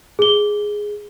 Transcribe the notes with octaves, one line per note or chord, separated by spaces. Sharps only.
G#4 G7